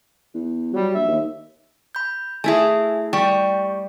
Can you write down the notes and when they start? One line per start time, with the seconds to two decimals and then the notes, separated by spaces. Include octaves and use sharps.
0.34 E2
0.73 F#3 G3
0.94 A#1 E5
1.07 D#2
1.95 B5 G6
2.44 A3 E4 G#4 E5 G#5
3.13 G3 G4 G5 C#6